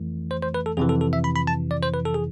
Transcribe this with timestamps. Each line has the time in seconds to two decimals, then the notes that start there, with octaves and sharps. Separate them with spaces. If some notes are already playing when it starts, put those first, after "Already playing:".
Already playing: F2 E3 A3
0.31 C5
0.42 C5
0.54 B4
0.66 A4
0.77 F2 C3 E3 G#4
0.89 A4
1.01 A4
1.13 E5
1.24 B5
1.36 B5
1.47 A5
1.71 D5
1.82 C5
1.94 B4
2.05 A4
2.14 G#4